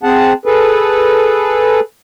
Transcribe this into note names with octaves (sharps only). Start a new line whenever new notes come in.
C4 G#4 F#5 A5
G#4 A4 B4